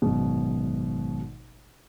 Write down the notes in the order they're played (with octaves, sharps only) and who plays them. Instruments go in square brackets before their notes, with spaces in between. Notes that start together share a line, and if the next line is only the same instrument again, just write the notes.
[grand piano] G#1 F#2 B2